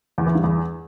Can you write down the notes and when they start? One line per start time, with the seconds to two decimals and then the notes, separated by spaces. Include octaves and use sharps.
0.18 E2
0.26 E3
0.35 G2
0.44 E2